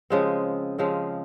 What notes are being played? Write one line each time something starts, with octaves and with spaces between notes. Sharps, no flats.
C#3 F3 G#3 C4
C#3 F3 G#3 C4